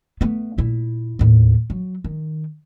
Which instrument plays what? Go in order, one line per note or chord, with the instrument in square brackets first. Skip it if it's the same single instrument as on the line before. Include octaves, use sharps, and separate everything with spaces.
[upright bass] A3 B3
A#2 E4
D#2 A2
F#3
D#3